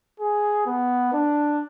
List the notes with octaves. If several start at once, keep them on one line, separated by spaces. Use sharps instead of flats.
G#4
B3
D4